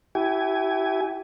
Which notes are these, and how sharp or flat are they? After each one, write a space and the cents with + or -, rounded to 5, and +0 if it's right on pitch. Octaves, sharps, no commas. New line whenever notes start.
E4 +0 G4 -35 G#5 +0